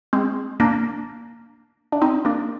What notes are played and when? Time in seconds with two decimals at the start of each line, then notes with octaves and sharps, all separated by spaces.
0.13 G#3 C4
0.60 A#3 D4
1.92 D4
2.02 C4 D#4
2.25 A#3 D4